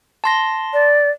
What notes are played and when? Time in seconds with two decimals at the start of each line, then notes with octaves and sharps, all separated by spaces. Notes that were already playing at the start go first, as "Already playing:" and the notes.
0.24 A5 C6 A#6
0.73 D5